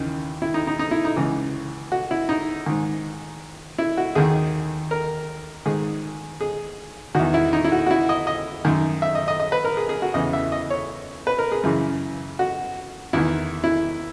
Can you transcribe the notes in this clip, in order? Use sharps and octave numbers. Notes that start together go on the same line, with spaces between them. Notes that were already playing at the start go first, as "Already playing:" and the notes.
Already playing: D#2 C#3 E3
E4
D#4
D#4
D#4
E4
D#4
C#2 C#3 E3
F#4
E4
D#4
G#2 D#3
E4
F#4
D#2 D#3 G#4
A#4
G#2 D#3 G#4
G#4
E2 D#3 F#4
E4
D#4
E4
F#4
F#4
E4
D#5
D#5
F#2 D#3
E5
D#5
D#5
D#5
B4
A#4
G#4
G#4
F#4
E2 C#3 E3 D#5
E5
D#5
C#5
B4
A#4
G#4
F#2 C#3 E3
F#4
E2 D#3 E4
E4